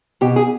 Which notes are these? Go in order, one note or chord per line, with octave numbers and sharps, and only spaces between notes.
B2 G4
G#4